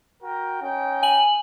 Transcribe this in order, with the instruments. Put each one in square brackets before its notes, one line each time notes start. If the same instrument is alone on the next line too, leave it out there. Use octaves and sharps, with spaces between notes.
[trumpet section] F#4 A#4 G5
C#4 D#4 G5
[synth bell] G#5 F#7